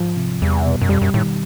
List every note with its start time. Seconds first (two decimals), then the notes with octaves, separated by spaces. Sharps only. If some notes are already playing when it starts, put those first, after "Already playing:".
Already playing: G#2 F3
0.17 C3
0.42 E2 G3
0.66 B2
0.81 F#2
0.90 F2 G3
1.02 F#2
1.14 A2 D#3